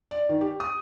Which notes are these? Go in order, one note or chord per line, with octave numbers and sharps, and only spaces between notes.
D5
D#3
G4
D#6